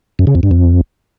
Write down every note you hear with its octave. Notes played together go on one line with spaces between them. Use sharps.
F#2
C#3
F2
G2
F2